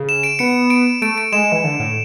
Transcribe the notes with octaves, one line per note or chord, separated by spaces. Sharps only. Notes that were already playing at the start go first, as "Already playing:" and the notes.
Already playing: C#3
E7
D7
B3 C#7
D7
A3 D7
D7
G#3 E7
E3
D3
A2